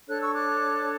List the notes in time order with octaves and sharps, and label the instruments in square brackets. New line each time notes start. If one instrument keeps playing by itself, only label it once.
[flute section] D4 A4 C#5 F#6
C#6 E6
D6 F#6